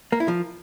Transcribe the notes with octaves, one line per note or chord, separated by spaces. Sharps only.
A#3
E4
F3